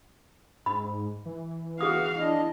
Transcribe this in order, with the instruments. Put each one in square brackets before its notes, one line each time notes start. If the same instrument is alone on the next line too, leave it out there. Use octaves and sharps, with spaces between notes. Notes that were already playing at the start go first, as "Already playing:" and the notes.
[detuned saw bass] G#2 [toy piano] B5
[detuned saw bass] E3
[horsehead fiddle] F#4 F5 [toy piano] G#4 D#6
[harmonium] D4 D#5 [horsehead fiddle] E4